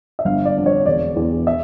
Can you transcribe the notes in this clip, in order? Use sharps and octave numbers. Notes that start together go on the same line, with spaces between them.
E5
G1 F5
D5
F2 D3
C#5
E1 D5
E2 E3
E5